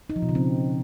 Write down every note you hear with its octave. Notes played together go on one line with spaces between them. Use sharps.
D#4
F3
B2
C#3
C4